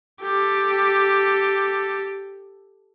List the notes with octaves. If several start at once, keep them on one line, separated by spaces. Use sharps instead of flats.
G4 A4